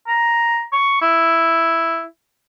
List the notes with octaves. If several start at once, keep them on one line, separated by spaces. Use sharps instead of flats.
A#5
C#6
E4